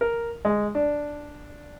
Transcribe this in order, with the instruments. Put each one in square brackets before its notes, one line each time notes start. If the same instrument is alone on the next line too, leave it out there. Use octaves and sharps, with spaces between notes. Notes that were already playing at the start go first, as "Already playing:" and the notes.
[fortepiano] A#4
G#3
D4